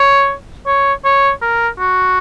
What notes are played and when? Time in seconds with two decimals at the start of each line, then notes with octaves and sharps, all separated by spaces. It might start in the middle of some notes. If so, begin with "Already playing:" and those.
Already playing: C#5
0.66 C#5
1.04 C#5
1.42 A#4
1.79 F#4